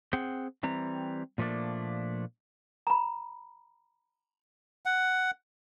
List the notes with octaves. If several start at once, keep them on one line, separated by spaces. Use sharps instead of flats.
C4 G#4 F#5 G5
E3 G3 C4 A#5
A#2 F3 A3 A#3 D4 D5
A#5 B5
F#5